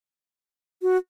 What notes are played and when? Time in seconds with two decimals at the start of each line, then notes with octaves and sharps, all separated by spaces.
0.82 F#4